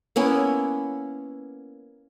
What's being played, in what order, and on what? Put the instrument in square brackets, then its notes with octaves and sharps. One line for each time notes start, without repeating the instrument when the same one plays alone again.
[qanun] A#3 B3 C#4 E4